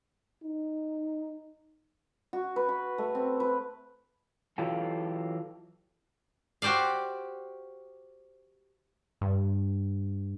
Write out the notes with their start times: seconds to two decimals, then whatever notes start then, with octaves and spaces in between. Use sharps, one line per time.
0.44 D#4
2.33 F#4
2.56 B4
2.69 B5
2.98 A3
3.15 C4
3.40 B4
4.58 E3 F#3 F4 G4 A4
6.62 F#4 G4 C5 D5 F5
9.21 G2